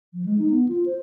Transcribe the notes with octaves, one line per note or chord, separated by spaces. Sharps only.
F3
G#3
D#4
B3
F4
C5